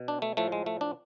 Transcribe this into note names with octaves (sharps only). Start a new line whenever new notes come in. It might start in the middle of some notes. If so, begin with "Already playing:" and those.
Already playing: B2
D4
A3
A2 F3 A3
G#3
A3
D4